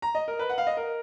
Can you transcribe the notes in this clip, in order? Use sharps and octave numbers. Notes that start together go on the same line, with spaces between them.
A#5
D#5
A#4
B4
F#5
F5
D#5
A#4